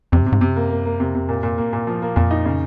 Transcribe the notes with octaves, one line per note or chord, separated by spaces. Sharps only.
F2 C3
G#2
C3
G#2
F#2 C3
A#3
A#3
A#3
F2 C3
C3
A#2
A#2
A#3
A#2
F3
A#3
F2 A#2
D#4
C#3